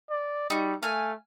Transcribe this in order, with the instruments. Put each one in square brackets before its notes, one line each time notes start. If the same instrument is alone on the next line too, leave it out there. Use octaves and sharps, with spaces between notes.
[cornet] D5
[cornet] G3 [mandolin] D#4 F#4
[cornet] A3 [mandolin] F5 G#5